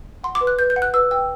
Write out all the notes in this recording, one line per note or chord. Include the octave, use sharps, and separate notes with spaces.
F#5 C6
D6
B4
F#6
B4 G6
G6
F#5
F#6
B4 E6
G5 E6